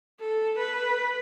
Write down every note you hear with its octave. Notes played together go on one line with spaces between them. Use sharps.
A4
B4